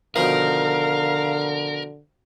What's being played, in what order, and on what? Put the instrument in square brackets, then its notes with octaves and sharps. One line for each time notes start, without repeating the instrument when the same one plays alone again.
[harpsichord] B2 D#3 F3 [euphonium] D3 [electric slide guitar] A#4 [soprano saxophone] F5